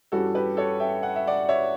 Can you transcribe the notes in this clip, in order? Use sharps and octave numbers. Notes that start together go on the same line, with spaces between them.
G2 E3 G3 C#4 F#4 A4
G4 B4
A4 C#5
E5 G5
F#5
E5
D5 F#5
C#5 E5